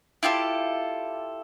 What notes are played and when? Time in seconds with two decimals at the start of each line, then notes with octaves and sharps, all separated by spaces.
0.23 E4 F4 G4 A4